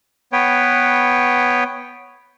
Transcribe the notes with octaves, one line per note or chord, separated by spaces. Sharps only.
B3 B4 C#5 G5